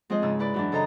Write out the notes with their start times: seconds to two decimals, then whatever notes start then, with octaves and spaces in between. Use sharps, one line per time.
0.10 F3 G#3 C4 G#4 C5 D#5
0.22 G#2 C#3 E6
0.39 E4 B4 D5
0.54 F#2 E3 D4
0.72 C#3 A4 C5 D#5 A#5